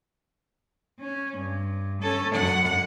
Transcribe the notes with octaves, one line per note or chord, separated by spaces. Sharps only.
C#4
G2
C#4 A4
F#2 F#5